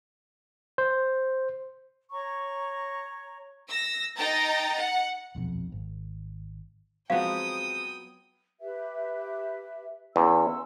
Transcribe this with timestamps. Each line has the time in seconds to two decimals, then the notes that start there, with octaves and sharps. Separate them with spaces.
0.78 C5
2.11 C#5 A#5 C#6
3.68 E6 A#6
4.16 D#4 D#5 G5 A#5 A6
4.76 F#5
5.35 D#1 B1 F2
5.72 G#1
7.10 F3 F#3 G#3 B3 C4 F5 G5 D#6
8.60 G4 B4 E5
10.16 E2 C#4 C6 E6